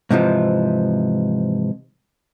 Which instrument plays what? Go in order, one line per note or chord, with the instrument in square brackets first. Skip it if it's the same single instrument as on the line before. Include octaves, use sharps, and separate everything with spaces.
[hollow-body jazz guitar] G#2 C3 E3 F3